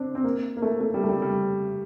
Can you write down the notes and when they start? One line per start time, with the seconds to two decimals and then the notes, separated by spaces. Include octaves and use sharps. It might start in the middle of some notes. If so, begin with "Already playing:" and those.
Already playing: C4 D4
0.15 C4
0.24 A#3
0.57 A#3
0.62 A3
0.81 A3
0.94 G3
1.03 A3
1.09 G3
1.22 G3